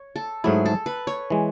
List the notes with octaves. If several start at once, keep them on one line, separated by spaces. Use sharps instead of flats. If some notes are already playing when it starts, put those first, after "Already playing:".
Already playing: C#5
A4
G#2 F#3 A3 E4 G#4
A4
B4
C#5
E3 G#3